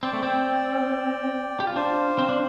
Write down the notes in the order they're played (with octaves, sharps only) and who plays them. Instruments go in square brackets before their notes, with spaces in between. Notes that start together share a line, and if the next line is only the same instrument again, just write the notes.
[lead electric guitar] C4 [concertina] D5 G5
[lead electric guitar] A3
C4
G4
F4
[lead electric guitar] D4 [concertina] C5 F5
[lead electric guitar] C4
D4